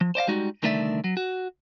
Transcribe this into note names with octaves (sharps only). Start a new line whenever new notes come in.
F3
C5 D5 D#5 F5
G3 G#3 D#4 F#4
C2 D3 D#3 A3 D5 E5
F#3
F#4